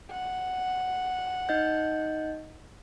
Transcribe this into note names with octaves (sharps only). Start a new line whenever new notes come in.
F#5
D#4 D#5 G6